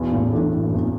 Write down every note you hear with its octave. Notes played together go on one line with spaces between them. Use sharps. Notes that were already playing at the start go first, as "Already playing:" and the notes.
Already playing: B1 E2 B2
A1 A2
A1 A2 E3 D4 A4
A2
F#2
E2